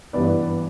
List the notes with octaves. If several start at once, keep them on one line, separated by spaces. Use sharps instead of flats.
G2 E3 B3 B4 D5